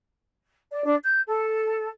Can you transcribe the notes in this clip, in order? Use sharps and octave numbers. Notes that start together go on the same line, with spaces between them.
D5
D4
G6
A4